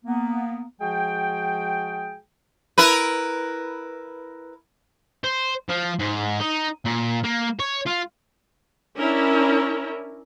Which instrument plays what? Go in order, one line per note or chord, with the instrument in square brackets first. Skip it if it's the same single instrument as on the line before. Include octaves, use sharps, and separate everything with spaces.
[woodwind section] A#3 B3
F3 G#3 F#4 G#4 G5
[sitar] E4 A#4 B4
[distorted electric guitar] C5
F3
G#2
D#4
A#2
A#3
C#5
F4
[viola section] C#4 D4 E4 A#4